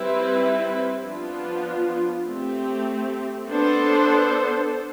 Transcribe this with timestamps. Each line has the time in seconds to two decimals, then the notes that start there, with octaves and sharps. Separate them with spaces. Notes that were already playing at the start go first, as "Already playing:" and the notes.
Already playing: G3 C4 E4 B4
1.03 F3 B3 D4 F4
2.25 A3 C4 G4
3.49 B3 D4 A4 C5